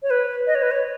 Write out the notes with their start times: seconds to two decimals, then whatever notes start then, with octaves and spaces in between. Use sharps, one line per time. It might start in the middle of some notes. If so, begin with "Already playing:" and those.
0.03 C#5
0.10 B4
0.47 D#5
0.55 C#5
0.62 B4
0.71 C#5